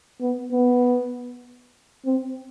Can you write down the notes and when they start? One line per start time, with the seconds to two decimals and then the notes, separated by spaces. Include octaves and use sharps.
0.21 B3
0.52 B3
2.05 C4